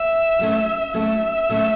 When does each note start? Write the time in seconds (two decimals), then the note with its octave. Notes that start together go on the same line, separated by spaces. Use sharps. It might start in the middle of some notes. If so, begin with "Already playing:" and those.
Already playing: E5
0.39 F#3 A3 C#4
0.94 F#3 A3 C#4 E5
1.49 F#3 A3 C#4